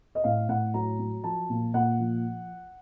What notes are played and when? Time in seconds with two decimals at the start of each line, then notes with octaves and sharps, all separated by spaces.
0.15 D#5
0.24 A2 F5
0.49 A2 F#5
0.74 F#3 A#5
0.99 F#3
1.24 F3 A5
1.50 A#2
1.74 A#2 F#5
2.00 F3